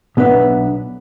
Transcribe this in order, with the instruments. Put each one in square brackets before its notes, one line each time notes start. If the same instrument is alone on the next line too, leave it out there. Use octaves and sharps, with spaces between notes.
[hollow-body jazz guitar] B1 B3 D4 B4 E5